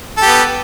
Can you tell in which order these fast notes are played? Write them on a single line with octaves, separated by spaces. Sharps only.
A4 G4 B3